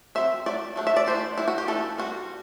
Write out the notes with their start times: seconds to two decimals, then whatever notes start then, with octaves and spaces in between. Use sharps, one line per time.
0.15 F#3 C4 E5
0.46 F#3 A3 D5
0.76 F#3 A3 D4
0.87 E5
0.96 D5
1.06 E3 A3 D4 C5
1.38 G3 D4 E4
1.48 F#4
1.58 G4
1.68 E3 A3 D4 A4
1.98 G3 C4 F#4